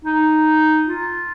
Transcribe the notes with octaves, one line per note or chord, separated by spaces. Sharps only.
D#4
F4